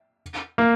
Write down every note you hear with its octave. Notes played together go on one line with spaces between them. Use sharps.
A#3